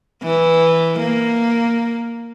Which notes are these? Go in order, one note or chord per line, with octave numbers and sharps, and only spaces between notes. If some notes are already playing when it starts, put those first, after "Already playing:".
E3
A#3